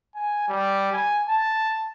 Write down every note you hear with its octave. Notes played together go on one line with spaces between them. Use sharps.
G#5
G3
G#5
A5